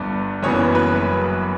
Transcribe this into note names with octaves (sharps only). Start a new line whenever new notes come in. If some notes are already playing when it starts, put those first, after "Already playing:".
Already playing: G1 G2 B3 D5
F#1 F#2 C#3 E3 B3 C#5
B4